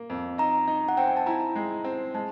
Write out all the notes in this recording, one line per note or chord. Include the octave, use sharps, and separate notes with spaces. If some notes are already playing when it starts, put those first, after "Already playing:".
Already playing: A#3
F2
D#4 A#5
D#4
F#5
C4 G5
G#5
A5
E4 A#5
G#3
C4
G#3 A5